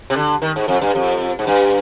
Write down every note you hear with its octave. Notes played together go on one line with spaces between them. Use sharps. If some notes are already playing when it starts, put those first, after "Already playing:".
C3
D3
D#3
G#2
F2
G2
F2
G#2
G2